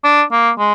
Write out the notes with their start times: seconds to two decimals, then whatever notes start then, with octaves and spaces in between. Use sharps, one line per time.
0.04 D4
0.31 A#3
0.58 G#3